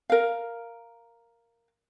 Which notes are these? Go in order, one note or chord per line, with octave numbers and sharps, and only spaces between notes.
A#4 F5